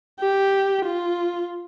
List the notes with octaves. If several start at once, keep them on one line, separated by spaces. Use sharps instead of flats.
G4
F4